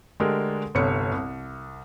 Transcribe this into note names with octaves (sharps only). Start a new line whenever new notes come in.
D3 G#3 A3 G4 A#4
G1 C2 C3 C#5 C#7
C2